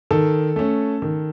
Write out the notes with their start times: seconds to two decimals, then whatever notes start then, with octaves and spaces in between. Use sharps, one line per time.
0.11 D#3 A4
0.56 A3 C#4
1.02 D#3